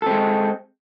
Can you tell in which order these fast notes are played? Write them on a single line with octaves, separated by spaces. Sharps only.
A4 C4 G#3